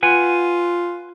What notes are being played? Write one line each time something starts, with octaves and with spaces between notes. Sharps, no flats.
F4 B4 F#5 G#5